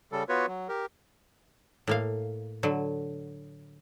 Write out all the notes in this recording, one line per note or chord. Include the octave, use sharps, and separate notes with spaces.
C#3 G3 A4
B3 F4 F#4 B4 C#5
F#3
G4 A#4
A2 A#3 F5
D3 F#3